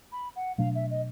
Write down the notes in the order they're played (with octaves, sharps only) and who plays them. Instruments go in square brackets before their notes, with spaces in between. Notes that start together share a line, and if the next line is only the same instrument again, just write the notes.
[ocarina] B5
F#5
[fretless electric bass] B2 F#3 A3 D4 [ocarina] F5
[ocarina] E5
D#5